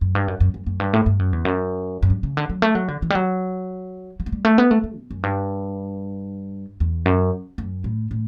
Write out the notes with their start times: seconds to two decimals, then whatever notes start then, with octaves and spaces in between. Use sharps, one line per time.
0.01 F#2
0.15 G2
0.28 F#2
0.40 F#2
0.54 F#2
0.66 F#2
0.80 G2
0.93 A2
1.06 G2
1.19 F#2
1.33 E2
1.45 F#2
2.02 F#2
2.10 G2
2.23 C#3
2.37 D3
2.50 F#3
2.62 A3
2.75 F#3
2.88 D3
3.02 E3
3.10 G3
3.15 F#3
4.20 F#3
4.26 A3
4.32 G3
4.45 A3
4.58 B3
4.71 A3
4.84 A3
4.97 B2
5.11 F#2
5.23 G2
6.80 E2
7.06 F#2
7.58 F#2
7.84 A2
8.11 A2